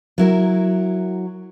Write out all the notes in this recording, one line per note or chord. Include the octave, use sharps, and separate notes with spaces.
F#3 E4 A#4